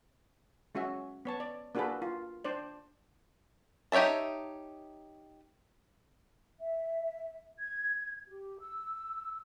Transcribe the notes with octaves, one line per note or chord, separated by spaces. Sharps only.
G#3 C#4 F#4 E5
B3 C#5 A5
D5
A#3 D4 F#4 G#4 A4 B4
F4
D4 C5 D5
D#4 G4 C#5 E5 A5
E5
G#6
G4
E6